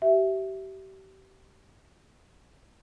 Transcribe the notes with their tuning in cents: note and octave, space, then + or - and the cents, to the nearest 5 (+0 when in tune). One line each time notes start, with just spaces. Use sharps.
G4 -35 E5 +0